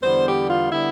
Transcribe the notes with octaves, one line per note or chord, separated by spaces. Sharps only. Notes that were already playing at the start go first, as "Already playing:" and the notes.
E2 D3 G3 B3 C5
G4
F4
D3 G3 B3 E4